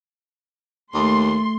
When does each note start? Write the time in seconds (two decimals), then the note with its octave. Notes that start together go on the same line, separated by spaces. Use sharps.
0.94 D#2 A3 C6